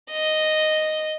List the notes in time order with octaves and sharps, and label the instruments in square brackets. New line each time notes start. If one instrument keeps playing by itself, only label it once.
[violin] D#5